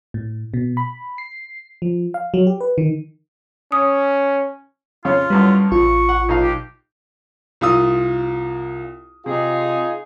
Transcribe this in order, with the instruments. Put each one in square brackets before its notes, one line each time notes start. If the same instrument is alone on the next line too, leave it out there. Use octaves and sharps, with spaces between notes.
[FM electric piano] A2
B2
B5
C7
F3
F5
F#3
G4
B4
D#3
[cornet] C#4 [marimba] D#6
[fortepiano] F2 C#3 C#5 [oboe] F4
[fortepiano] F#2 A2 B4 [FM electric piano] G3
[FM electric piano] A1 F4 [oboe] C#6
[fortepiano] F#5
B1 D#4 F5
[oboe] G4
[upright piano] C2 F4 D#6
[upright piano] C3 [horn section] D#4 F4 G#4